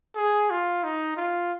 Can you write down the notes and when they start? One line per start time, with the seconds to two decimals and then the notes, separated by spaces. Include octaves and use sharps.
0.16 G#4
0.50 F4
0.84 D#4
1.17 F4